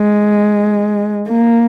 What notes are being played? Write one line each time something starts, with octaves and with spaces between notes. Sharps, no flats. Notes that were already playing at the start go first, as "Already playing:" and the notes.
Already playing: G#3
A#3